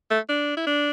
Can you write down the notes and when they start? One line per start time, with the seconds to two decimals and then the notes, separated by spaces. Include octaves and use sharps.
0.11 A3
0.29 D4
0.57 E4
0.67 D4